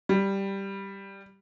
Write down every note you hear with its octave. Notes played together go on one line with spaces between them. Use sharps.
G3